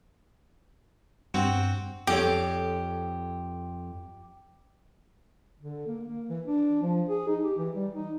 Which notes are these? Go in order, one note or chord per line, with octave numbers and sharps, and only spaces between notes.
G2 C4 F#4
F2 G4 A4 C#5
D3
A#3
A#3
E3
D4
F3
G#4
D#4
G4
E3
G3
D#4